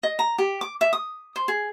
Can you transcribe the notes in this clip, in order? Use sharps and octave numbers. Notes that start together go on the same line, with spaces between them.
D#5
A#5
G4
D6
E5
D#6
C5
G#4